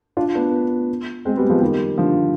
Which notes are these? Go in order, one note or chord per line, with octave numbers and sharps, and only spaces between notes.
D4 F4
B3 D4
G#3 C4
G3 B3
F3 G#3
D#3 G3
D3 F3